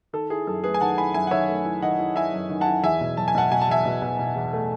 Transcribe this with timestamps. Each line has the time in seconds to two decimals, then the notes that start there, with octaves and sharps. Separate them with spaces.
0.13 D#3 A4
0.30 E4 G#4
0.47 F#2 A4
0.63 A3 G#4 B4
0.74 G#5
0.81 D#3 F#5 A5
0.98 E4 G#5 B5
1.14 F#2 E5 G#5
1.27 F#5
1.31 D#3 C#5 E5
1.48 A3
1.65 E4
1.82 D#3 D#5 F#5
1.99 E4
2.16 E4 E5 G#5
2.33 F#2
2.50 D#3
2.61 F#5 A5
2.67 E4
2.83 E2 E5 G#5
3.01 B2
3.17 F#3 A5
3.28 G#5
3.35 B2 F#5 A5
3.52 B2 G#5
3.61 A5
3.68 E2 E5 G#5
3.85 B2
4.02 B2
4.19 B2
4.36 E2
4.53 A3